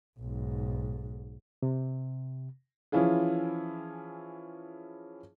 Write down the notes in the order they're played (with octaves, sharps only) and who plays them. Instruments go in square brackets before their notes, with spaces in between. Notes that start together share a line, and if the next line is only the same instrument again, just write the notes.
[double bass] B1 G#2
[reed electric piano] C3
[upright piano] E3 F3 C#4 E4 F4 G#4